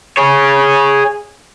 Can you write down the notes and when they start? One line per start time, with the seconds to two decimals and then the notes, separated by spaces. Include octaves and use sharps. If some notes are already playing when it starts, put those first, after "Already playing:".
0.17 G#4 C#5